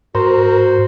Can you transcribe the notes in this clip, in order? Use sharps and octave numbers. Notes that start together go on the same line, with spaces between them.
G#2 F#4 A#4 C5